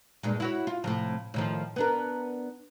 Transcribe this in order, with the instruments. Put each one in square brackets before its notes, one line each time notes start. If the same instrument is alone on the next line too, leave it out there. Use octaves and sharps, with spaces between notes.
[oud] G2 A#2 G#3
E4 F#4 C#5
F4
A2 C3 F3
A2 D#3 F3
B3 D4 A#4